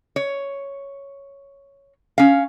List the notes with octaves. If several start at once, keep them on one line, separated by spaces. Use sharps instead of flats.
C#5
C#4 F5